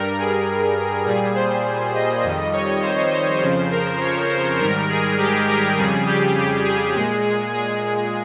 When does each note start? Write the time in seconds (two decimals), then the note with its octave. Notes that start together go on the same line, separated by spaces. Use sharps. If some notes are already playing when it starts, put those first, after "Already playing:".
Already playing: G2 G3 A#4
0.18 G#4
1.05 A#2 G3 G#4
1.35 C5
1.94 D#5
2.23 F2 D#3 G3
2.53 C#5
2.82 C5
3.12 C5
3.42 F2 C#3 F3
3.71 A#4
4.01 C#5
4.30 C5
4.59 G#2 D#3 G3 A#4
4.89 G#4
5.18 G4
5.48 A#4
5.77 F2 C#3 G3 G#4
6.06 G4
6.36 G4
6.65 G#4
6.95 A#2 G#3 G#4
7.24 G#4
7.54 G#4